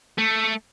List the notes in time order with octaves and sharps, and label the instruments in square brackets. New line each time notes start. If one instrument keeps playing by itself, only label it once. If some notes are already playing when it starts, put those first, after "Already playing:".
[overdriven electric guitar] A3